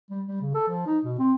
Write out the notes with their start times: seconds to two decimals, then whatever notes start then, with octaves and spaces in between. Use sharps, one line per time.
0.11 G3
0.27 G3
0.41 C#3
0.54 A4
0.68 F3
0.87 D#4
1.05 B2
1.19 C4